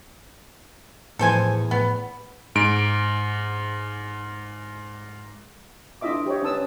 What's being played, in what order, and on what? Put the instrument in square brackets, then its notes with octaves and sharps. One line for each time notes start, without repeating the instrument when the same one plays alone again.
[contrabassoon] E2 [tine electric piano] A2 F3 [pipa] A4 C5 G#5
[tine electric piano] A2 [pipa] B3
[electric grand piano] G#2 D7
[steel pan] D4 E4 F4 D#5 E5 D6
G4 C5 C#5 D#5
C#4 D#4 B4 A5 D#6 E6